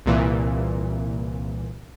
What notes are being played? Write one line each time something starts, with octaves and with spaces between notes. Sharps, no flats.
C2 A#2 E3